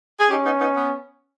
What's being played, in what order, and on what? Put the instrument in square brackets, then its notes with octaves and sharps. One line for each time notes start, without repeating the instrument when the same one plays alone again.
[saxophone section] G#4
[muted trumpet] C#4 [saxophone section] D#4 G4
[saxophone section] B3 D#4
B3 D#4
B3